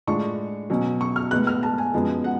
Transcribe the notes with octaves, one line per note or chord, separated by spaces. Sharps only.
A2 G#3 D4 F4 C#6
B2 F#3 C#4
C#6
F6
A2 G#3 B3 F#6
F6
A5
G#5
F#2 F3 G#3 B3
F#5